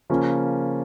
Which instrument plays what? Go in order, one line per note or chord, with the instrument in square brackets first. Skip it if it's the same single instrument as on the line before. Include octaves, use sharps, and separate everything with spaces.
[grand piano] C#3 F3 A#3 C#4